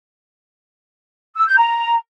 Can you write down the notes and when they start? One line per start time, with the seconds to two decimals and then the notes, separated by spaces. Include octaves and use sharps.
1.36 E6
1.47 G6
1.57 A#5